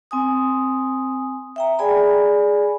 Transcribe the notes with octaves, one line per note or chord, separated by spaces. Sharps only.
C4 G#5 D#6
E5 G5 A#5
G#4 D5 G#5 B5